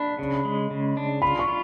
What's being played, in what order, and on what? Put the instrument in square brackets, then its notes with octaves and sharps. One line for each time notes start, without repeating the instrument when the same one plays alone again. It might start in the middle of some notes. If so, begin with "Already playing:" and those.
Already playing: [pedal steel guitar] D4 [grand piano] B5
[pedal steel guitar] C#3
G#3
C#3
D4
[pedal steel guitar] F4 [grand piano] B5
[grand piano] C#6
[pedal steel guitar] F4